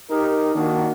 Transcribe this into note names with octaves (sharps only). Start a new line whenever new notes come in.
D#4 G4 A#4
D#3 A#3 D4 F#4